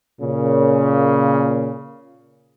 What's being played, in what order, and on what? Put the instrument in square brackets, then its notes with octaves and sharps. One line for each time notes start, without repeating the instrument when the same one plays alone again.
[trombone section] A#2 C#3